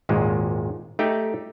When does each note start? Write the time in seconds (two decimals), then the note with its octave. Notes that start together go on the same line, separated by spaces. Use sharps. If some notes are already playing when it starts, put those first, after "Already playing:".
0.09 G#1 D#2 A#2 G#3
0.99 A3 D#4 G4 G5